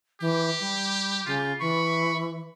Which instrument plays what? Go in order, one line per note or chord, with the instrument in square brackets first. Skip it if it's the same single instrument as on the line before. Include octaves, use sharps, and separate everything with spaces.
[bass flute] E3 [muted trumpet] G4
[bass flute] G3
[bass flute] C#3 [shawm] F4
[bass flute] E3 [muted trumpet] B5 [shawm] C#6